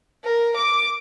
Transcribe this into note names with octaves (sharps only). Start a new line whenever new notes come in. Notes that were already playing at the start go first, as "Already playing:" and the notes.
A#4
D6